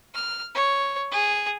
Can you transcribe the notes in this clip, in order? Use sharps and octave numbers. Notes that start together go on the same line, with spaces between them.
F6
C#5
G#4